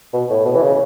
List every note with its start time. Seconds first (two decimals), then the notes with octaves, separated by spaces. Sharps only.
0.14 B2
0.30 A2
0.45 B2
0.56 E3
0.62 C#3